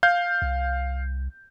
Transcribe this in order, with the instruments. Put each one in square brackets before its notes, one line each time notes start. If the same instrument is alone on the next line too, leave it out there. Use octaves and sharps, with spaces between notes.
[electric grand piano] F5 G6
[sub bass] C2